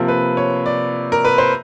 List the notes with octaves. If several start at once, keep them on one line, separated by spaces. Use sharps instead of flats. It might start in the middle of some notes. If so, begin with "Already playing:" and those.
Already playing: C3 F3 A#3
B4
C#5
D5
A#4
B4
C5